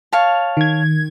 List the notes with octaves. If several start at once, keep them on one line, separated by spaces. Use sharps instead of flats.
C#5 F5 A5
D#3 G#6